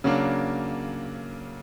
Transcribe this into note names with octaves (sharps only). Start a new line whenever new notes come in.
C#3 F#3 A#3 D4